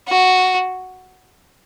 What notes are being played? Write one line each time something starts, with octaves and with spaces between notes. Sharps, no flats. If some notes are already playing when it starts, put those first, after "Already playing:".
F#4